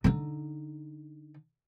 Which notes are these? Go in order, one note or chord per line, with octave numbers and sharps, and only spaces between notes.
D3 D#4